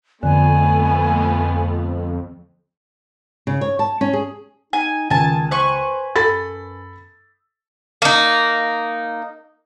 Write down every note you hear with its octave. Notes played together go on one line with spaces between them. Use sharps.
F2 D3 A3 B3 G#5
C#3
C#5
A5
C#4
G#4
D#4 G#5
C#2 D#3 G#5 A5
B4 C5 G#5 C#6
F#2 A4 B5 A6
A#3 D#4